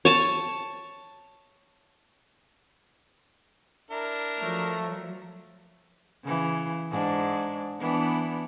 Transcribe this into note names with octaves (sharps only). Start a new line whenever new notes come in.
C#5 A5
D4 E4 A#4
F3 F#3 A3
C#3 E3
G#2 D4
E3 B3 D4